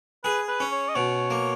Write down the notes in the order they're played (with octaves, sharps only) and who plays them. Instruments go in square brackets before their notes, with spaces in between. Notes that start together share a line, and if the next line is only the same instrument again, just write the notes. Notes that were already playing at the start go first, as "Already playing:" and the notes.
[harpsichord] G#4 [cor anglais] B4
[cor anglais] B4
[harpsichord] C#4
[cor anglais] C#5
D#5
[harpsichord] B2 [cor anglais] C#5
[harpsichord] A#3